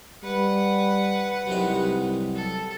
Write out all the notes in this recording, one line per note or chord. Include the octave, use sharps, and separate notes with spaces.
G3 B4 F#5
C2 F#2 C3 D#4
A4